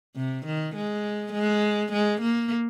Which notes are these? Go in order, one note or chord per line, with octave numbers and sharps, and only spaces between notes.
C3
D#3
G#3
G#3
G#3
A#3